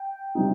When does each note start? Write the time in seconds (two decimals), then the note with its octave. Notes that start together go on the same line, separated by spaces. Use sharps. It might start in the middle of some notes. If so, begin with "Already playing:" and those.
Already playing: G5
0.35 C3 G3 C4 D#4